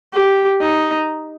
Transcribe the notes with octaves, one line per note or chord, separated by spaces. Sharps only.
G4
D#4